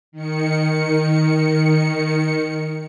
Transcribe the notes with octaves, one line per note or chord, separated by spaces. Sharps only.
D#3 C#7